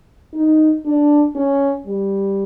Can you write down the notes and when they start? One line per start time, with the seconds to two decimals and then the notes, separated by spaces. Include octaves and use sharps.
0.33 D#4
0.85 D4
1.35 C#4
1.86 G3